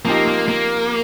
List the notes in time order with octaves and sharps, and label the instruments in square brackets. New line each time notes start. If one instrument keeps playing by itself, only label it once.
[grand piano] F3 C4 D#4 G4 [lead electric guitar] A#3
[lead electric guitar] A#3
A#3